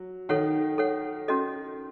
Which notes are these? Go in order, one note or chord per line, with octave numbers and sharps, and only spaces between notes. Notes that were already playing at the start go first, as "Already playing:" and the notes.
Already playing: F#3
D#3 A4 C#5 F#5
A4 C#5 F#5
C#4 F#4 A4 D#5